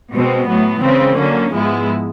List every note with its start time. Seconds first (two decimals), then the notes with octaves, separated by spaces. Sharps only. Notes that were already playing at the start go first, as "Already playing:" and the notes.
0.12 B2 G#3 C4
0.47 A2 F#3 B3
0.81 C#3 E3 G#3 C4
1.17 D3 F#3 A#3 C#4
1.52 G#2 F3 G#3 B3 E4